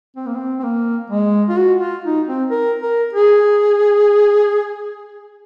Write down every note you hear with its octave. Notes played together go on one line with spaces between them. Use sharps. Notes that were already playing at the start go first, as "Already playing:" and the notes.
C4
A#3
C4
C4
A#3
G#3
F4
F#4
F4
D#4
C4
A#4
A#4
G#4